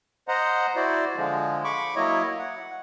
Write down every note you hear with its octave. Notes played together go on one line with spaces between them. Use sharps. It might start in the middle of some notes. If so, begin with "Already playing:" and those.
C5 D#5 F#5 A#5
E4 F#4 C5 D5
D3 F3 G#3
B5 C#6 D6
F#3 A#3 E4 C#5 D#5
F#5